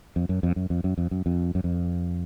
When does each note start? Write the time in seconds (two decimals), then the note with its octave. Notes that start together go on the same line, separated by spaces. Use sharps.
0.16 F2
0.29 F#2
0.43 F2
0.56 F#2
0.70 F2
0.84 F#2
0.98 F2
1.11 F#2
1.26 F2
1.55 F#2
1.64 F2